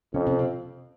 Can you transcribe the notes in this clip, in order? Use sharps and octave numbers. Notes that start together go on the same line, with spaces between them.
F2 C#3 C#4
C3 C4
C3 C4